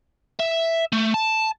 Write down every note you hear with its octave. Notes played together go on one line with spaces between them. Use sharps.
E5
A3
A5